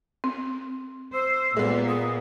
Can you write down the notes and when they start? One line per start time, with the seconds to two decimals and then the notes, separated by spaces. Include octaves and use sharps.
0.24 C4
1.14 C5 E6
1.57 A#2 G#3 B3
1.89 D#6